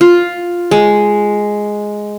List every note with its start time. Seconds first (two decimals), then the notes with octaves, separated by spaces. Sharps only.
0.01 F4
0.71 G#3